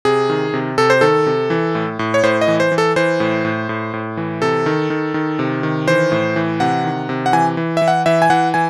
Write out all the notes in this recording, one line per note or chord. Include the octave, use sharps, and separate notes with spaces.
C3 G#4
D#3
C3
C3 A4
C5
D#3 A4
C3
E3
A2
A2
C#5
A2 C5
D#5
E3
C5
E3
A4
E3 C5
A2
A2
A2
A2
E3
C3 A4
D#3
D#3
D#3
C3
D#3
E3 C5
A2
E3
C3 F#5
D#3
C3
F#5
E3 G#5
E3
E3 E5
F#5
E3 E5
G#5
E3 F#5
E3 G#5